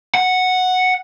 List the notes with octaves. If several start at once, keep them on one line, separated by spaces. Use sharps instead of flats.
F#5